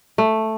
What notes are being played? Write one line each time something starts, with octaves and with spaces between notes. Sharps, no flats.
A3